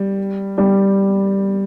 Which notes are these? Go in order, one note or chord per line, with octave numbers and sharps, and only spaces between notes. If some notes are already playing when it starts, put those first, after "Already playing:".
Already playing: G3
G3